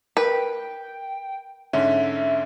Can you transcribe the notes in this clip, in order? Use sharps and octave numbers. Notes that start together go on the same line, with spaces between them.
A#4 B4 G5
G#2 D3 C#4 E5